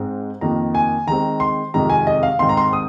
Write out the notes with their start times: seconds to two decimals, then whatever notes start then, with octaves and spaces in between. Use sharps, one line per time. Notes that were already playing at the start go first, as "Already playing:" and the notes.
Already playing: G#2 G#3 C4 D#4
0.41 F2 D#3 A#3 A#5
0.75 G#5
1.07 D#3 G#3 C4 A#5
1.40 C6
1.74 F2 C3 D#3 G#3 A#5
1.90 G#5
2.07 D#5
2.23 F5
2.39 G#2 D#3 C4 D#4 C6
2.49 A#5
2.57 C6
2.73 D#6